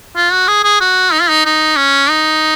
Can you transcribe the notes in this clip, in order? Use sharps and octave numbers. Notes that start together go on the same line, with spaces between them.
F4
F#4
G#4
G#4
F#4
D#4
F4
D#4
D#4
C#4
D#4